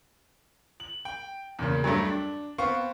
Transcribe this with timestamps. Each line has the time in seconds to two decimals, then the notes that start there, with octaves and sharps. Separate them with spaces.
0.80 F#7
1.05 G5
1.59 E2 A#2 C#3
1.84 G2 F#3 G3 A3
2.05 D4
2.58 B3 C4 F5 C#6